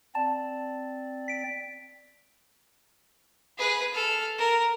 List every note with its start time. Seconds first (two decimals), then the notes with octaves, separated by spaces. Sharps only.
0.15 C4 D5 A5
1.28 B6 D7
3.58 G#4 B4
3.93 A4 F6
4.39 A#4